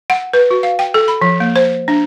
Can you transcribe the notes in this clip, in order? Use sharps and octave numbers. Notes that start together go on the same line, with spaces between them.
F#5
B4
F#4
F5
G5
A4
B5
F3
A#3
C5
D4